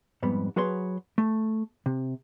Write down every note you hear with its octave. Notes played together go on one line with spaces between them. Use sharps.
F2 G#2 G3 B3
F#3 F#4 G#4 B4 C#5 C6
A3
C3